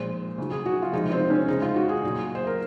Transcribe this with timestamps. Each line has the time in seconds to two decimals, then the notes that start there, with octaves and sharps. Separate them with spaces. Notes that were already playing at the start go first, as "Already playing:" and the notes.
Already playing: A#2 F3 G#3 C5
0.38 C#3 F#3
0.51 G#4
0.66 F#4
0.82 F4
0.92 C3 F3 G#3 D#4
1.12 C4
1.30 C#4
1.48 C#3 G#3 D#4
1.62 F4
1.76 F#4
1.89 G#4
2.03 A#2 F#3
2.35 C5
2.47 A#4